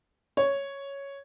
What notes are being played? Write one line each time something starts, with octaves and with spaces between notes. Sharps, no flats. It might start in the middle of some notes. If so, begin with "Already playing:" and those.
C#5